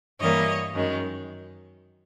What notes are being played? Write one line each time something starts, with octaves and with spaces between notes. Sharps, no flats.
G2 E3 G3 A#3 C#5 D#5
F#2 D#3 G#3 C#4